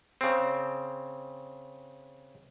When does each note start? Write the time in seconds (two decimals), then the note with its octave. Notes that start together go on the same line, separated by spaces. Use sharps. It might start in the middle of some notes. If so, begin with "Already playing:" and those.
0.21 C#3 C4